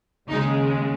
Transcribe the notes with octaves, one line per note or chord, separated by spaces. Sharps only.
D#2 C#3 G#3 D#4